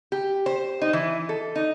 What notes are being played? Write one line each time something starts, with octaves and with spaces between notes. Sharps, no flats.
G4
C5
D#4
E3
A4
D#4